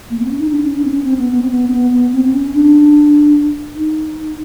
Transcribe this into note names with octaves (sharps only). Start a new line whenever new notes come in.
A#3
B3
C4
C#4
D#4
D4
C#4
D4
C4
C#4
C4
B3
B3
C4
B3
C4
B3
B3
C4
C4
C#4
D4
D#4